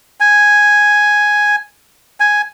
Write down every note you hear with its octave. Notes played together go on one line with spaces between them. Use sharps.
G#5
G#5